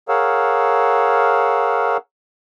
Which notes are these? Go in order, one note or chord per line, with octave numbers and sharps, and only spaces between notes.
G#4 A#4 C#5 F5 F#5 E6